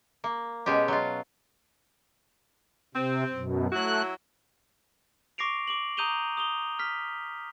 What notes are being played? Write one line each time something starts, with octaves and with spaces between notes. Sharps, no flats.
A#3
B2 G#3 C#4 G4
F#3 F4
C3 C4
F#2 B2
F#3 A3 E4 F#4 F#6
C#6 D6 A#6 C7 D7 F7
D6 D7 F#7
A#5 D#6 G6 D#7 F7 G7
D#6 F7 G7
F6 B6